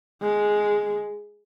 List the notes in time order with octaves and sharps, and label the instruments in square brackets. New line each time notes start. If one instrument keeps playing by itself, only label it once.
[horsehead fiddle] G#3